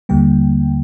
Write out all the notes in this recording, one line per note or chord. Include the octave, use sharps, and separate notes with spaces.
D#2 D3 G3 A#3 G5